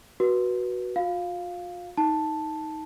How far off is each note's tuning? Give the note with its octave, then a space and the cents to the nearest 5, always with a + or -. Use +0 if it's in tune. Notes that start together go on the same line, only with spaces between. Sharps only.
F#4 +0 B4 -20
F4 +45 F5 +0
D#4 +15 A5 +0